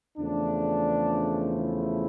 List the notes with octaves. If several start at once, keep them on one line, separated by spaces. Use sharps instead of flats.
E2 C#3 F3 A3 D4
E4